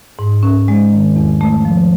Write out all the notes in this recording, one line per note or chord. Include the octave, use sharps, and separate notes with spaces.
G#2
C#4
G#3
D#3
E2
A3
F3